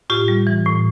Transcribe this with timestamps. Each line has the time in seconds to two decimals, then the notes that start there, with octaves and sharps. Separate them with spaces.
0.10 A2 F4 G4
0.28 G3
0.47 E3
0.66 A2